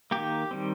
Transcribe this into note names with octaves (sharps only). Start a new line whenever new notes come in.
D#3 A#3 G4
D#3 G3 C4